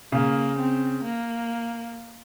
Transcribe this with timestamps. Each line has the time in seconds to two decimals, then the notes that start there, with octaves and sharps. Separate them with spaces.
0.12 C#3 A#3
0.59 C4
1.05 A#3